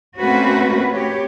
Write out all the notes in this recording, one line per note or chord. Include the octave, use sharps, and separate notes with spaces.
A3 A#3 C4 C#4 F#4 B4
G4 C#5